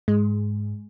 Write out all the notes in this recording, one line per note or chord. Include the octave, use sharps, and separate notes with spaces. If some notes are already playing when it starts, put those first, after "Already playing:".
G#2 G#3